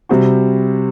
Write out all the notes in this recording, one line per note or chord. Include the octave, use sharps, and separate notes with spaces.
C3 G3 C4 F#4